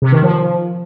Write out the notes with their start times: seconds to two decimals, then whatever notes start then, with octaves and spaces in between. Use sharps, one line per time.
0.02 C3
0.12 D#3
0.23 F3